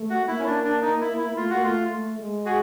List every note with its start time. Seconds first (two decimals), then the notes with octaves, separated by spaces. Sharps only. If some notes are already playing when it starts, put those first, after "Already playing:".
Already playing: A3
0.10 F#4
0.22 B3
0.28 A#3 E4
0.39 C#4
0.46 D4
0.64 D4
0.82 D#4
1.01 E4
1.19 E4
1.28 A#3
1.36 A3 F4
1.50 A#3 F#4
1.64 A3 F4
1.92 A3
2.18 G#3
2.45 F#4 G#4